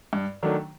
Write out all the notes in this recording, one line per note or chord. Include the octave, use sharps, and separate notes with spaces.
G2
D#3 F#3 A3 D4